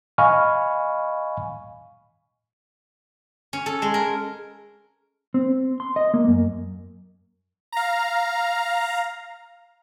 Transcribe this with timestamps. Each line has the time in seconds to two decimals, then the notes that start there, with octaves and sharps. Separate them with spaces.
0.18 D#5 F5 G#5 B5 C#6 F6
3.53 C#4
3.66 A4
3.82 G#3
3.94 A#4
5.34 C4
5.80 C6
5.96 D#5
6.14 A#3
6.28 F#2
7.72 F5 A#5